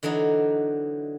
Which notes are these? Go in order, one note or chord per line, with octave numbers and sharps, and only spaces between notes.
D3 E3 F#3 D4 D#4